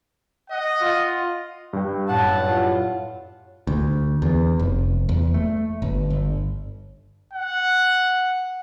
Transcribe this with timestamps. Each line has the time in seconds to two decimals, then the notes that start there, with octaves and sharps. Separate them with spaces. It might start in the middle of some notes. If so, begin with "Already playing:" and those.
0.50 D#5 F#5
0.81 F4
1.73 G2 G5
2.09 F#2 A2 F#5 A5
2.46 F4
3.67 D2
4.22 E2
4.59 F1
5.09 E2
5.34 A3
5.82 G1
6.10 G1
7.33 F#5